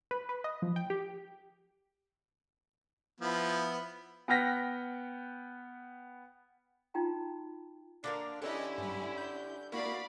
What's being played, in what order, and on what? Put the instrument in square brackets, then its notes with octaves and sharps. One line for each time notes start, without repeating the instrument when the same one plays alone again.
[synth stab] B4
B4
D#5
F3
G5
G4
[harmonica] F3 B3 E4
[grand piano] B3 F#5 G5 F6 A#6 B6
[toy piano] D#4 F4 F#4 G5 A#5
[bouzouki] D3 A#3 A#4 [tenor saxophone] D4
[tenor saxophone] D3 [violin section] C#4 E4 [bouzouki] G4 [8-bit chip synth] A4 C#5 D#5
[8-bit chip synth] G2 G3
G6
[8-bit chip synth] A#3 E4 A#4 [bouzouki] F#4 [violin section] D5 F5 B5